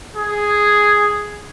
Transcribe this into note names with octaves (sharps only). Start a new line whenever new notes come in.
G#4